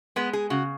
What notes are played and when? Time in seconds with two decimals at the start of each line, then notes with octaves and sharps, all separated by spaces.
0.16 G#3 B3
0.33 G#4
0.50 C#3 F#4